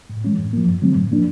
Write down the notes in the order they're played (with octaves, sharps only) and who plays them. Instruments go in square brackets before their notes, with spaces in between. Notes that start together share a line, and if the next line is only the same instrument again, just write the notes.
[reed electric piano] A2
E3 G#3 C#4
A2
F3 A#3
G2
D3 F#3 A3 C4
A2
F3 A#3 D4